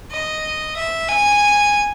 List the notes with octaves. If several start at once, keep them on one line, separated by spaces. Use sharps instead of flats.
D#5
E5
G#5